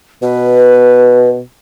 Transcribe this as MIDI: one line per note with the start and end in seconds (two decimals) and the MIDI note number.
0.22 1.41 47
0.22 1.29 71